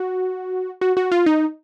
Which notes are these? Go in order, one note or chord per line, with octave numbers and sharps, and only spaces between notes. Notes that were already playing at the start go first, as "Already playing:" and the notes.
Already playing: F#4
F#4
F#4
F4
D#4